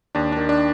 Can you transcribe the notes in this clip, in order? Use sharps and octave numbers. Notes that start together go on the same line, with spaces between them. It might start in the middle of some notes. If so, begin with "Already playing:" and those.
D#2 D4
D#3 D4
D4